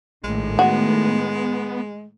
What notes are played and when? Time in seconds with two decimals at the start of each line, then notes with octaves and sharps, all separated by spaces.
0.24 A#1 A2 D#3 G#3
0.59 B3 F#4